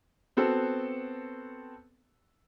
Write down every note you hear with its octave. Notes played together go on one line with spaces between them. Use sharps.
B3 C4 F#4 A4